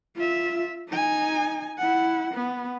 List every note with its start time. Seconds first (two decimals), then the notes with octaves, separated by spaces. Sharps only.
0.16 F4 E5
0.88 D#4 G#5
1.78 E4 F#5
2.34 B3